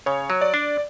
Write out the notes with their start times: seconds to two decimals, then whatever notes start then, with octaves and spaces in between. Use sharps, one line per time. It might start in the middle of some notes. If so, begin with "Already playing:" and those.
0.06 C#3 C#5
0.30 F#3
0.41 D5
0.54 D4